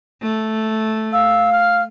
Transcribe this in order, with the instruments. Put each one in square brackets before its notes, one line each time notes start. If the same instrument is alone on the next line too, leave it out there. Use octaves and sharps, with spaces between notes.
[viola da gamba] A3
[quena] F5 [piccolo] E6
[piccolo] F6